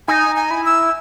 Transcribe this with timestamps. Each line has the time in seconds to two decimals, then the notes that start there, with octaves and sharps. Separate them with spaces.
0.08 D#4 G#5
0.36 G#5
0.51 E4
0.66 E6